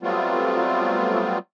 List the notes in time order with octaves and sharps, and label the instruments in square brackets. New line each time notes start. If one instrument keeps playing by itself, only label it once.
[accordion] F#3 G3 A3 B3 C4 F4